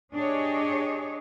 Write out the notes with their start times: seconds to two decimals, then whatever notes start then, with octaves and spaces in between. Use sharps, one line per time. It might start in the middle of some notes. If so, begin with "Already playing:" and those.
0.14 D4 G4 G#4 C#5 D#5